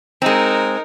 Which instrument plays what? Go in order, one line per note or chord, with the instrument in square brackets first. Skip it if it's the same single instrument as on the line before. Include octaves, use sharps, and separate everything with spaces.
[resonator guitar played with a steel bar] G#3 C4 [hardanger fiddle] D#4 A#4